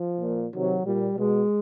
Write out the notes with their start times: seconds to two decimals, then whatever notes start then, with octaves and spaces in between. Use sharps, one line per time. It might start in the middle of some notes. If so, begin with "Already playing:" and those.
Already playing: F3
0.21 A#2
0.53 C3 D#3 F#3
0.84 A#2 G3
1.17 B2 G#3